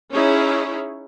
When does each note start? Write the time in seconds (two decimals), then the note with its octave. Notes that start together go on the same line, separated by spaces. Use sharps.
0.13 C#4 D#4 E4 G#4 C#5